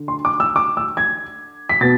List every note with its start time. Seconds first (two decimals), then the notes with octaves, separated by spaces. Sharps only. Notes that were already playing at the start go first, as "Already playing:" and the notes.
Already playing: D3
0.08 C6
0.25 D6
0.40 E6
0.56 D6
0.77 E6
0.97 G#6
1.69 B6
1.81 B2 B3 A6